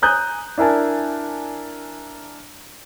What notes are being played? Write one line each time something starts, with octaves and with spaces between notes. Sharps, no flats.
G#5 A#5 D#6 F#6 G6
D4 E4 A#4 G#5 A5